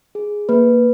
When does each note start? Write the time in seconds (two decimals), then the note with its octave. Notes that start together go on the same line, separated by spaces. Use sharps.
0.15 G#4
0.49 A#3 B4